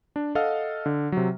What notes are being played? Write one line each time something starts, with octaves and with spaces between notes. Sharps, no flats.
D4
A4 D#5 F5 F#5 F6
D3
C3 F#3